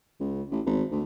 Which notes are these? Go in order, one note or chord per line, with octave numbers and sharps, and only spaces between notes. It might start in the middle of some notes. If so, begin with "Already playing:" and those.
C#2
A1
G#1
D2